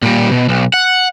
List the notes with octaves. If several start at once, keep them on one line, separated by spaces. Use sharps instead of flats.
A#2 G3
B2
B1
F#5